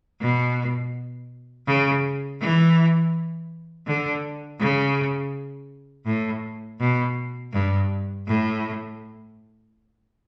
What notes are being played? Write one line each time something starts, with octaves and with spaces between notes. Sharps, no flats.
B2
C#3
E3
D3
C#3
A2
B2
G2
A2